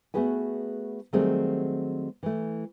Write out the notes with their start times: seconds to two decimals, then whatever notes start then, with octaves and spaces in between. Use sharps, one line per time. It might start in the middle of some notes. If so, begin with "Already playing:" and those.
0.14 A3 B3 F#4 G#4 B4 G#5
1.13 D#3 F#3 G3 A3 C4 G#4
2.23 E3 A3